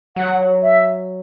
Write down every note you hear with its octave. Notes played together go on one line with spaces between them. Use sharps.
F#3 F#5
E5